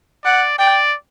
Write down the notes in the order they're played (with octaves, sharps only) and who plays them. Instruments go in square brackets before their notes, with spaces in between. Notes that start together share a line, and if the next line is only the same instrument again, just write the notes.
[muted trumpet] D5 [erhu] F#5
[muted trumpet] D5 [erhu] G5